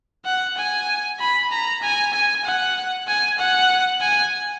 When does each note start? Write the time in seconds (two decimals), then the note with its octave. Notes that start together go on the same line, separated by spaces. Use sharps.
0.25 F#5
0.57 G#5
1.20 B5
1.51 A#5
1.82 G#5
2.13 G#5
2.45 F#5
3.07 G#5
3.38 F#5
4.01 G#5